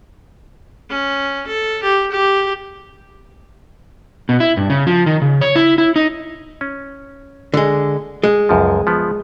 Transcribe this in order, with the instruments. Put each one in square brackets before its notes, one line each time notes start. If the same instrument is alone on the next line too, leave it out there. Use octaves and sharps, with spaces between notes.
[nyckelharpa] C#4
A4
G4
G4
[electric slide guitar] B2
E4
G2
C#3
F3
D#3
C#3
C#5
E4
E4
D#4
[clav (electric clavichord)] C#4
[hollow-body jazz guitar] D3 G#3
G#3
[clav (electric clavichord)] C#2 F#2 F3
F3 B3